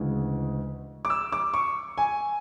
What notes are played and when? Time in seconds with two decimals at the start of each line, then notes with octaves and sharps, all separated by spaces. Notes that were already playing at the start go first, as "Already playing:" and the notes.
Already playing: D2 C#3 E3 G#3
1.05 D6
1.10 E6
1.32 D6
1.54 C#6
1.98 G#5